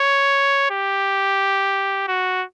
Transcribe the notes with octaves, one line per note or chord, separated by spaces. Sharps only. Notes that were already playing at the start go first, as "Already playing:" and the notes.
Already playing: C#5
G4
F#4